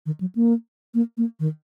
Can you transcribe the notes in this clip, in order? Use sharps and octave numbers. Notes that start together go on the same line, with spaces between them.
D#3
F#3
A#3
A#3
A#3
D#3